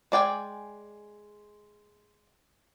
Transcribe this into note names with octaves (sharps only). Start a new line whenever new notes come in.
G#3 D5 G5 G#5